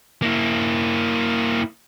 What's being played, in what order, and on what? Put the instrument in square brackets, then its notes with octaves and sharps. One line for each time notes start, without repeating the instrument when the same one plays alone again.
[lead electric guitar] A#3 E4